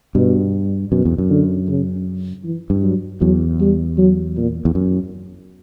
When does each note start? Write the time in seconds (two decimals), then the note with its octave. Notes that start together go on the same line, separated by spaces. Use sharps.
0.14 G2 B2
0.91 F#2 B2
1.05 E2
1.18 F#2
1.30 D3
1.69 C#3
2.44 E3
2.70 G2
2.83 F#3
3.21 E2 F#3
3.60 G3
3.98 F#3
4.37 A#2
4.65 E2
4.75 F#2